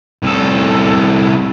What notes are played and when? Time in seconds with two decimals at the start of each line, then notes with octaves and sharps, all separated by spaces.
0.23 C2 A4